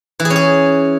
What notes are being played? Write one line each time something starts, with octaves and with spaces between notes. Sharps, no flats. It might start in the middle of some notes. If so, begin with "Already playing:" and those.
E3
G#4
C#4
G#4